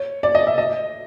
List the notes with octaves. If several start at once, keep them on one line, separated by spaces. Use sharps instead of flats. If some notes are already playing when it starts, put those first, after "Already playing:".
Already playing: C#5
D5
D#5
E5
D#5